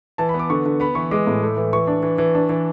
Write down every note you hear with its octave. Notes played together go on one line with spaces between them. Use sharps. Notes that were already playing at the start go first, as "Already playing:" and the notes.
E3 A5
B5
B3
D6
D3 C#6
D3
B3 B5
E3 C#6
G#3 D6
A2
A3
E3
E3 C#6
D4
E3
E3
D4
E3